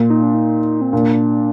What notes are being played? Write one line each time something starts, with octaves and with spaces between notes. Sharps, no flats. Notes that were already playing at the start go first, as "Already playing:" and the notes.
Already playing: A#2
D#4
D4
D#4
C4
A#2 D4